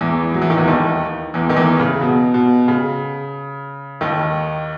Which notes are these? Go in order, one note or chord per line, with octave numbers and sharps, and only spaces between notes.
E2 E3
F#3
E3
D#3
E2 E3
D#2 D#3
E2 E3
D#3
E2 E3
C#3
B2
B2
C#3
D#2 D#3